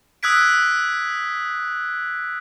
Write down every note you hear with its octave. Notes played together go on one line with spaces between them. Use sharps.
D#6 E6 F#6 G#6 B6 D7